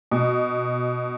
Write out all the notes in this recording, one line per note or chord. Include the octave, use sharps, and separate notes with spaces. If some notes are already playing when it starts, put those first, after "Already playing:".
B2